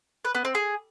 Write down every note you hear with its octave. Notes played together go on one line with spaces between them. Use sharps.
B4
B3
C4
G#4